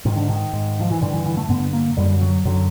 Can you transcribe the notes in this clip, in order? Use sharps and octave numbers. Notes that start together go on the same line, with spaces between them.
G#2 D#3
D3
D#3
G#2
F3
E3
G2 D3 D#3
E3
E3
A3
G2 D3 B3
A#3
F#2 D3 G3
F#3
F#2 D3 F#3